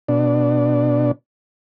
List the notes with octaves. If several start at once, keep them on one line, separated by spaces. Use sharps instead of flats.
B2 D4